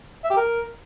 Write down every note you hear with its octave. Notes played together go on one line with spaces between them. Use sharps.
E5
G4
A#4